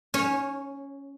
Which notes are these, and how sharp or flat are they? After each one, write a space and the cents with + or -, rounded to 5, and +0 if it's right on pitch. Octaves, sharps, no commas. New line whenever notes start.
C#4 +5 C#5 -20